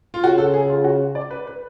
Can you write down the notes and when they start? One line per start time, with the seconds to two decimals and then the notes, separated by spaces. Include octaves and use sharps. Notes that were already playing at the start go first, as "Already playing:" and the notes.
0.14 F4
0.23 C#3 F#4
0.38 A4
0.54 G#4
0.69 F4
0.84 F#4
1.15 D5
1.31 B4
1.47 B4